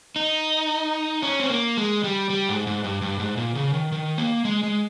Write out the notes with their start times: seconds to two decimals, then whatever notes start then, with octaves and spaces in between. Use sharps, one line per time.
0.16 D#4
1.22 C#4
1.40 C4
1.50 A#3
1.77 G#3
2.04 G3
2.30 G3
2.49 G#2
2.67 G#2
2.84 G2
3.02 G2
3.20 G#2
3.37 A#2
3.55 C#3
3.74 D#3
3.92 D#3
4.18 A#3
4.45 G#3
4.63 G#3